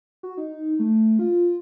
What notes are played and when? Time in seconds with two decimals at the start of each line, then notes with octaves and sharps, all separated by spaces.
0.23 F#4
0.37 D#4
0.79 A3
1.19 F4